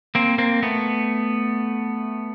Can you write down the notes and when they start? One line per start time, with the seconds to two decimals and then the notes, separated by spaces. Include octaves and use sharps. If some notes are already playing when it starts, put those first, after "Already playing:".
0.15 A#3 C4
0.38 A#3 C4
0.63 A3 B3